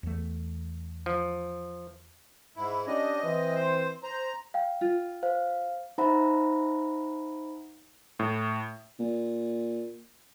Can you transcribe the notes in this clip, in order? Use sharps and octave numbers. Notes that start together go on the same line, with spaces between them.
E2 A3
F3
G#2 E4
C#4 D4 G4 D#5
E3 C4
C5
C5 A#5
F5 G5
F4
C5 F5
D#4 C5 E5 F#5 A#5 B5
A2
A#2